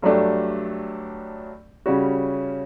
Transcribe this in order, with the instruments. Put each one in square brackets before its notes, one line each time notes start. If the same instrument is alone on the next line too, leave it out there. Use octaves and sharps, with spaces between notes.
[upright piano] G2 F#3 A3 D4 G4
C#3 G3 C#4 F#4